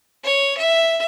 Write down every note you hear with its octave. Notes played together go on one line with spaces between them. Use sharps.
C#5
E5